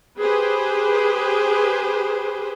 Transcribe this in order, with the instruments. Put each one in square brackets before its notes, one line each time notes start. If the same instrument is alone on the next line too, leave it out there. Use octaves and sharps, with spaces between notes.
[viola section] G4 G#4 B4 C5